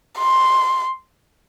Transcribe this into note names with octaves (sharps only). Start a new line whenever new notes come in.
C6